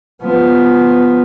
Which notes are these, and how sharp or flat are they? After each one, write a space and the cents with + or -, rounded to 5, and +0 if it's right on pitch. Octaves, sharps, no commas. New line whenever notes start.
F3 +0 B3 +0